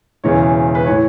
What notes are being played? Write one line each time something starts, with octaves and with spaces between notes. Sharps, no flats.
E1 E2 C#3 E3 C#5
B4
A2 E3 C#5